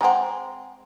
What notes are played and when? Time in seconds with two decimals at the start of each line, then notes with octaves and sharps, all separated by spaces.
0.01 G#3 C4 F#5 G#5 A#5